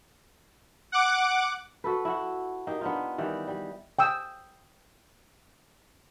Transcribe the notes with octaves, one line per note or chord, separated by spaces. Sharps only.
F#5 D6
F#4 A4 B4
E4 F#4 F#5
A#3 D#4 G4
B3 D4 D#4 F4
D#3 E3 G3 D5
G3
G5 D#6 E6